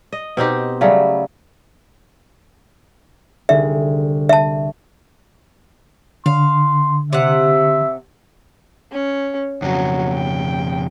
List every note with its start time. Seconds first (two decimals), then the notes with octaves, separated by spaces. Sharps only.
0.12 D#5
0.37 B2 C4 D#4 G4
0.81 C#3 F#3 G3 A3
3.49 C2 D3 G#4 E5
4.29 E5 A5
6.26 D3 F5 C6
7.13 C3 E5 F#5
8.92 C#4
9.62 F2 C#3 F#3
10.12 G5